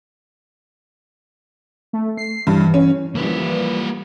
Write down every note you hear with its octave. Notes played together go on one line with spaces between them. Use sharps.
A3
C7
G2 E3
C#4
E3 F3 G3 A#3 B4